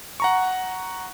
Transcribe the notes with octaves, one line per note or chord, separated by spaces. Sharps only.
F#5 A#5 C#6